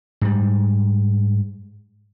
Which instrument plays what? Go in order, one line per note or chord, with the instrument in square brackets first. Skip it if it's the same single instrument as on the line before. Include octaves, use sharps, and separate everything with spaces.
[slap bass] G#2 G3